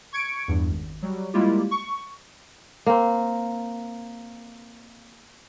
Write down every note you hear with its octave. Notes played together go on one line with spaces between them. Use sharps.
C#6 G#6 C#7 D7
E2 G2
G#1
F#3 G3
G3 G#3 A#3 E4 F4 G4
C#6
A#3 C4